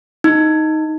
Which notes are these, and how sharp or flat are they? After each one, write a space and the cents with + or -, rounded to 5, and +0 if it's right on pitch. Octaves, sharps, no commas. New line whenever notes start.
D#4 +5